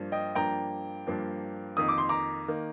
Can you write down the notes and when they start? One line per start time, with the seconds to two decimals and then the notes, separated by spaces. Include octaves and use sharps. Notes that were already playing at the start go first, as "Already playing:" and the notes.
Already playing: G2 F3 A#3 D4
0.12 D#5 G5
0.35 G2 F3 A#3 D4 G5 A#5
1.07 G2 F3 A#3 D4
1.77 F2 D#3 A#3 D#6
1.89 D6
1.98 C6
2.09 A#5 D6
2.48 D#3 A#3